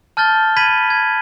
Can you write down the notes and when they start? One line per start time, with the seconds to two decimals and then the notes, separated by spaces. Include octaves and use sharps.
0.17 A5 F6 G6 A6 G7
0.56 B5 G#6 B6 D#7 F#7
0.90 G#6